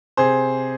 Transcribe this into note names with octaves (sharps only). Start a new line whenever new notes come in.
C3 G#4 C5